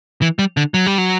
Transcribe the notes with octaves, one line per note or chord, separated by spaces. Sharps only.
E3
G3
D3
F#3
G3
F#3